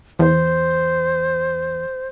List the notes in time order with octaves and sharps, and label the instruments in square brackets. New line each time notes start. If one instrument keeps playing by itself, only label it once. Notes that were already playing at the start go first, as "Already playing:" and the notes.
[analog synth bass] E2 [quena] C5